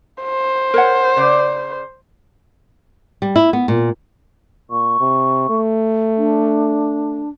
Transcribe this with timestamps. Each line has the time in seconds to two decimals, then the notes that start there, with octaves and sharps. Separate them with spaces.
0.24 C5
0.74 A#4 C#5 F#5
1.16 C#3 D5
3.22 G3
3.36 E4
3.53 B3
3.68 A#2
4.70 A#2 C#6
5.00 C3
5.49 A3
6.17 D4